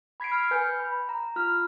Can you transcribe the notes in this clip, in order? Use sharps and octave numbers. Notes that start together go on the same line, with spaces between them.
B5 G#6 B6 C7 D7
F6
B4 G#5 G6
B5
A#5
F4 F6